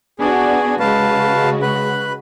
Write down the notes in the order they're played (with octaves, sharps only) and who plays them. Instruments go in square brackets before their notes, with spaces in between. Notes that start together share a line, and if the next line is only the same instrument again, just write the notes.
[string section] B3 D4 F#4 [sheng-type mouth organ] G#4
[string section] C#3 G#3 F#4 [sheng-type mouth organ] B4 F5 A5
[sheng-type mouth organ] B4 B5 F#6